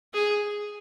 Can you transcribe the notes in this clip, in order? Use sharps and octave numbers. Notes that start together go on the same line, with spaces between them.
G#4